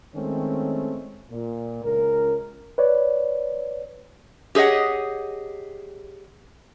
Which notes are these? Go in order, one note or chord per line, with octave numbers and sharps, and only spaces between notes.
D#3 G#3 A3 C4 C#4
A#2
C#2 C#4 A#4
B4 C#5 D5
G4 G#4 C#5 D#5 F#5